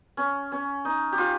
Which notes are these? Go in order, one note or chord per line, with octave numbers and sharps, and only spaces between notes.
C#4
C#4
D#4
G4
F4